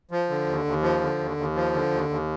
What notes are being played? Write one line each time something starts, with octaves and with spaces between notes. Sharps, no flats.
F3
D3
D#2
D#2
F3
D3
D#2
D#2
F3
D3
D#2
D#2